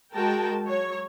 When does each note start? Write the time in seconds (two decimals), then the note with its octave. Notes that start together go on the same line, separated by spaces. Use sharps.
0.14 G#3 F#4 A#4 G5 A5
0.63 F#3 C#5